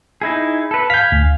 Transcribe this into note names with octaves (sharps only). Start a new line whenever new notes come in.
D#4 E4 G#4
A4 B4
F5 G#5 G6 B6
D2